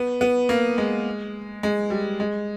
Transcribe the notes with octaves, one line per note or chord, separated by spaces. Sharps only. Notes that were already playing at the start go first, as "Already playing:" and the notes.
Already playing: B3
B3
A#3
G#3
G#3
G3
G#3